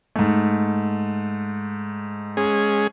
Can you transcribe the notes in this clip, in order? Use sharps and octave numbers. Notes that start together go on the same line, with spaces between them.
G#2 A3
G#3 C#4 G#4